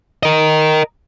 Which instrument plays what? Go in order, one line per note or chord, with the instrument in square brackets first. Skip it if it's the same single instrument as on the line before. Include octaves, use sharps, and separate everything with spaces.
[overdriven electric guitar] A#4 D#5